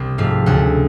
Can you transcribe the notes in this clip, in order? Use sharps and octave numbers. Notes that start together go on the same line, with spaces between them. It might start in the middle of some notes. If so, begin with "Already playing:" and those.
Already playing: C2 C3
G#2 F3 A3 F5
D2 C#3 F#3 F#5